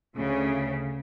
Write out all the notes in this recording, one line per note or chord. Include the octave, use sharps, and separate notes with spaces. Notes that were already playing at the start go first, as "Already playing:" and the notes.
D2 C#3